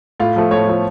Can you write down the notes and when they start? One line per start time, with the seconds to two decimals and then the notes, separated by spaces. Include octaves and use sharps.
0.20 A2 F4
0.36 F3 A3
0.51 A2 C#5
0.68 F3 A3